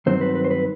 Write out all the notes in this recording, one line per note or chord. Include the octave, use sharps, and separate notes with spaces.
G2 D#3 F#3 C4 C5
B4
B4
C5
B4